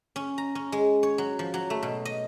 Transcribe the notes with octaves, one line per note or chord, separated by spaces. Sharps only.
C#4
A#5
C#4
G#3
C#5
F#3
F3
F#3
A3
B2
D#5